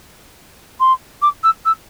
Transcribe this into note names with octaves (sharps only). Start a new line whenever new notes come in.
C6
D6
E6
E6